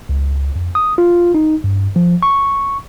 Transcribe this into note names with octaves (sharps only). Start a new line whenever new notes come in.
C#2
F2
D#6
F4
D#4
G2
F3
C#6